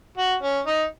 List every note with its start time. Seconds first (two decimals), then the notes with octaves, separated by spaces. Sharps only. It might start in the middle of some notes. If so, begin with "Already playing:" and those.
0.17 F#4
0.43 C#4
0.66 D#4